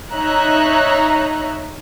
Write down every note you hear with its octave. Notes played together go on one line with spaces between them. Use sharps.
D#4 C#5 E5 A#5 F#6